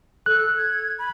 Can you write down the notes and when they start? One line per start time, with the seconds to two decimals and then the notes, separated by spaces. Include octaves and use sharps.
0.26 A4 F#6
0.57 G#6
0.99 B5